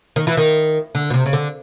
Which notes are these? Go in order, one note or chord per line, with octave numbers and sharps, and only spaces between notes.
D#3
E3
D#3
D3
B2
C3
C#3
D3